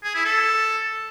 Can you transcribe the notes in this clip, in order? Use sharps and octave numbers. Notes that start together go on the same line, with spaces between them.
G#4
E4
A4